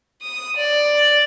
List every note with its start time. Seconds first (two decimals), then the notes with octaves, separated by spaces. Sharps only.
0.22 D#6
0.57 D5